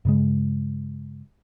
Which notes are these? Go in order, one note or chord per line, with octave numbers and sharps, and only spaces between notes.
G2 C#3 G#3